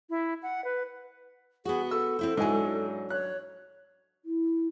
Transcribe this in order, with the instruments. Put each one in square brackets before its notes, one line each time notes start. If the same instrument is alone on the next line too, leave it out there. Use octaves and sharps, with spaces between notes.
[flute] E4
F#5
B4
[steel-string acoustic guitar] B3 F#4 [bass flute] G#4
[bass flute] A4 [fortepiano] E6
[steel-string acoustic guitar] C4 E4 C5
[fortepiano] G#2 E4 G#5 [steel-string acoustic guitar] F#3 D4
[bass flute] C#5 [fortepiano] F#6
[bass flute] E4